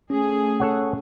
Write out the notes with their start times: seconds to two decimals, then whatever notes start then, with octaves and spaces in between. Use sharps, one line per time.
0.10 A3 C#4 G#4
0.60 A4 C#5 F#5